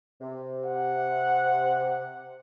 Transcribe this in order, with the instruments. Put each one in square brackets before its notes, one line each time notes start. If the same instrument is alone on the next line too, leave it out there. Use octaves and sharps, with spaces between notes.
[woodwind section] C3
[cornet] F#5